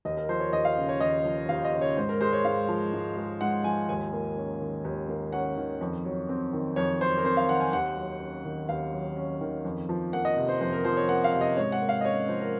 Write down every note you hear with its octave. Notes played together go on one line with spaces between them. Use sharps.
D#2 D#5
A#4
F3 C5
C#5
D#2 D#5
F5
C#3
C#5
D#2 D#5
F3
D#2 F5
D#5
C#3
C#5
G#2 C5
A#4
G#3 C5
C#5
G#2 F5
F3
G#2
G#3
G#2 F#5
F3 G#5
D#2 G#5
A#3
C#4
D#3
D#2
A#3
C#4 F#5
D#3
F2
F#3
C4
D#3
F2 C#5
F#3 C5
A#4
C4 C5
F5
D#3 F#5
G#5
D#2 F#5
F#3
C#4
D#3
D#2 F5
F#3
C#4
D#3
F2
F3
A#3 F#5
D#5
C3
C5
F2 C5
A#4
F3 C5
C#5
A#3 F#5
F5
C3
D#5
G#2 C#5
F#5
A#3
F5
D#5
C#4 C#5
F3 C5
A#4